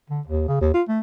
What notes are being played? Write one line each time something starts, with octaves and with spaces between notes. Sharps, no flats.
D3
D#2
C#3
D#2
F4
A3